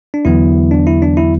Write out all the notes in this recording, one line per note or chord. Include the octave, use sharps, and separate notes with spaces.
D4
E2 D3 F#3 B3 E4
D4
E4
D4
E4